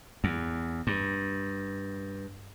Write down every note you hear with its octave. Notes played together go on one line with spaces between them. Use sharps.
E2
G2